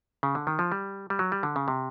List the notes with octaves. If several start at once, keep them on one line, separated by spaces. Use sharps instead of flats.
C#3
D3
D#3
F3
G3
G3
F#3
G3
D3
C#3
C3